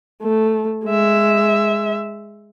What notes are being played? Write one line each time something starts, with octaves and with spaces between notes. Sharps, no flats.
A3
G#3 E5